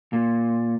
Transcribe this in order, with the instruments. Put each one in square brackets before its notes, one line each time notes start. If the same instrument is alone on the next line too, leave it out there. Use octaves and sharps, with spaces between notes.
[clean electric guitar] A#2